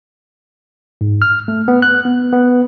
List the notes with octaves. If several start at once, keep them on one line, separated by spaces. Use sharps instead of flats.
G#2
F6
A3
B3
F#6
B3
B3